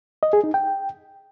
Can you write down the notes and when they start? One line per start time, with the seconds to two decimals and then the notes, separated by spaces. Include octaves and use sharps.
0.23 D#5
0.33 G#4
0.44 D#4
0.54 G5